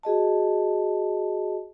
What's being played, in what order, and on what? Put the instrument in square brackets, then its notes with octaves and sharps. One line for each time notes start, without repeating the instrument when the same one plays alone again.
[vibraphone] F#4 G#4 D#5 A5